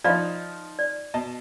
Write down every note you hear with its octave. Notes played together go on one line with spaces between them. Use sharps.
F3 D#4 D5 F5 B5
D5
B2 D#5 A5